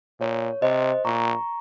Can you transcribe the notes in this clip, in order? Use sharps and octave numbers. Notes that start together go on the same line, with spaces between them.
A#2 C#5
C3 C5 D#5
A#2 A#5 C#6